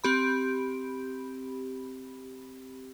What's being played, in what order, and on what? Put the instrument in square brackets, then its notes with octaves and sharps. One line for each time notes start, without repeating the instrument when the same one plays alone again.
[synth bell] C4 G4 B5